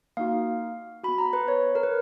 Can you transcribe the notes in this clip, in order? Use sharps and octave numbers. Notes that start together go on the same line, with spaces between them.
A#3 D#4 F#4 F5
B3 F#4 B5
A#5
B4
C#5
A#4
B4